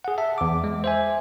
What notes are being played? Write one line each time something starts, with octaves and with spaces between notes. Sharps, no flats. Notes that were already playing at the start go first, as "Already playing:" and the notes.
G#4 F#5
E5 A5
E2 D6
G#3
C5 E5 G#5